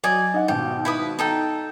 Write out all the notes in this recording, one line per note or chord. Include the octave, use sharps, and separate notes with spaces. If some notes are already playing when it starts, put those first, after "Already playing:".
F#3 D5 D#5 G#5
D#4 F#5
G#1 B2 G4
E4 B4 D#6
D#4 A4 G5